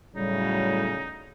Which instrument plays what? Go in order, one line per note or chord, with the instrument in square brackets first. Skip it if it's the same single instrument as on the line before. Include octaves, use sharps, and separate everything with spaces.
[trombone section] A2 F#3 [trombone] C#3 [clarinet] G3 [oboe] D#4